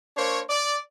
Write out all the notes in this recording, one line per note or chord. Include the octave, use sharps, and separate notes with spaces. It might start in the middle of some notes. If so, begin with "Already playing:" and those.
A#3 D4 C5 C#5
D5